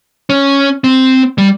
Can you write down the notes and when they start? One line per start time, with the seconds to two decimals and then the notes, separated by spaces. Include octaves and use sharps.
0.30 C#4
0.84 C4
1.38 G3